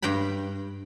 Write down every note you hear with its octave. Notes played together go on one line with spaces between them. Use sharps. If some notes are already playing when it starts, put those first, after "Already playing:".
G2 G5 A#5 B5